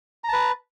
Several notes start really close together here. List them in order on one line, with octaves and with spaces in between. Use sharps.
A#5 A5 B4